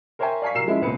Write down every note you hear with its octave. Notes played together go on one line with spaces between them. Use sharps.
A#4 C5 C#5 E5 G5 G#5
D5 F5 G#5 C#6 B6
C2 F#3 A#4 E6 C7 E7
F3 G#3 C#4 E4
E1 C#2 A#3 C4 B4 C#7